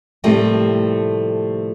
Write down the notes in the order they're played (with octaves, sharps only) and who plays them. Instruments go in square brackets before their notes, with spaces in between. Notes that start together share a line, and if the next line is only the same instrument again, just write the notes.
[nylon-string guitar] A2 C3 F3 G3 A3 A#3